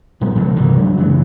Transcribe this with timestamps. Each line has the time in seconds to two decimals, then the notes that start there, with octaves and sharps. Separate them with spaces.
0.21 A#2 F#3 G#3 B3
0.35 A#1 C#3 F3 F#3
0.56 C2 G2 E3
0.76 F#3 G#3 B3 D4
0.97 F#2 C#3 E3 F#3